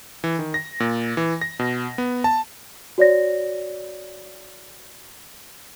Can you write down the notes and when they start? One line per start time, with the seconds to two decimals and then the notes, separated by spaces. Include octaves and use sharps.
0.24 E3
0.39 D#3
0.54 A#6
0.80 A#2
1.17 E3
1.41 A#6
1.59 B2
1.98 B3
2.24 A5
2.98 F#4 C#5 D5 A#6